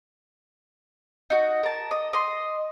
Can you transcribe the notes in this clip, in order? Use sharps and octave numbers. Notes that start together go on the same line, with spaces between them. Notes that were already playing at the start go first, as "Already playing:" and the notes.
D#4 F#4
A#4 A5
D#5
D#5 C6